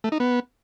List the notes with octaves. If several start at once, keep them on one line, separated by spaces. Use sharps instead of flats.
A3
D#4
B3